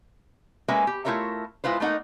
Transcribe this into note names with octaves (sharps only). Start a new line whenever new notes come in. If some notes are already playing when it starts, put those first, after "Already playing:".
G#3 A#3 C#4 B4 E5
G4
A3 E4 F4 A#4 C#5 E5
G#3 E4 F4 B4 C5
A3 A#3 D#4 F#5